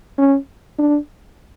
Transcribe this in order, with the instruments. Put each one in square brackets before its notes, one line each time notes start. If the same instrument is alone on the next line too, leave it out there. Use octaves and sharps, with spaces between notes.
[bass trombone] C#4
D4